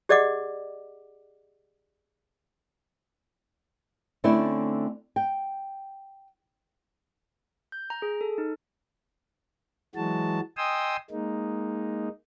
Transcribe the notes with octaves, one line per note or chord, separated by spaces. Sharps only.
G4 G#4 D5 D#5 F#5 D6
D3 A3 C4 C#4 E4 D5
G5
G6
A#5
G#4
A4
D#4
E3 F#3 G#3 F#4 A5
D#5 G5 G#5 C6 D#6 E6
G#3 A#3 D#4